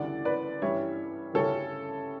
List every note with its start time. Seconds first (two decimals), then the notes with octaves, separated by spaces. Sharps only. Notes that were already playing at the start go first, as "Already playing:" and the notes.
Already playing: D2 C#3 E3 G3 D5 F#5
0.25 B4 D5
0.62 G2 E3 G3 C#4 C#5 E5
1.34 D2 C#3 G3 C#4 E4 A4 C#5